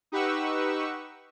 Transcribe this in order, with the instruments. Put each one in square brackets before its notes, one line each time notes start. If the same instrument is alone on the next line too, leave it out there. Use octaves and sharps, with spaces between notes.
[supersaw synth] D#4 G4 B4 F#5 C#6 E6